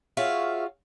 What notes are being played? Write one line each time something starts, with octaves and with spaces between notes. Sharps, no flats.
F4 F#4 G#4 C#5 E5 F5